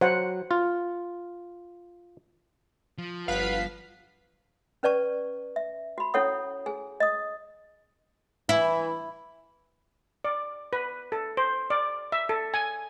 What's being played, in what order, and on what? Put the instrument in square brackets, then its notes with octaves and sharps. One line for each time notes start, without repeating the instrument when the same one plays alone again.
[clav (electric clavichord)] F#3 [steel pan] C5 F#5
[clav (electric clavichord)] F4
[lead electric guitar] F3
[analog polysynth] G1 B6 [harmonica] B4 F#5 [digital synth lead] F5
[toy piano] C#4 B4 D5 A5 C#6
E5
F#4 B5
C#4 E4 A4 C#5 F#5 D#6
G#4 G#5
D#5 D#6
[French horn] E3 [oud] E4
[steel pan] D5
B4
A4
C5
D5
E5
A4
G#5